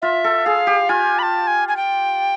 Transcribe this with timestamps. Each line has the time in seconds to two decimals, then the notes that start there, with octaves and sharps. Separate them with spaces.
0.02 F4 E5
0.24 A4
0.45 G#4 F5
0.67 G4
0.89 F4 G#5
1.19 B5
1.23 A5
1.47 G#5
1.68 G#5
1.77 G5